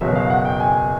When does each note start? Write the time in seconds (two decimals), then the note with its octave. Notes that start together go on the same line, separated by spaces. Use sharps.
0.01 F#1 E2 B2 F#3 E5
0.15 F5
0.30 F#5
0.45 G5
0.60 G#5